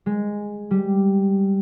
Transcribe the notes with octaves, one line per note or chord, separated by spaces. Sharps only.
G#3
G3